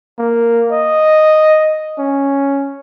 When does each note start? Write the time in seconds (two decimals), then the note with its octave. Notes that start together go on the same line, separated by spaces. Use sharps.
0.18 A#3
0.72 D#5
1.99 C#4